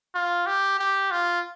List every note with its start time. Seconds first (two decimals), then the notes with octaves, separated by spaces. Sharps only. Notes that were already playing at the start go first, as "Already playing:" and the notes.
0.14 F4
0.46 G4
0.79 G4
1.11 F4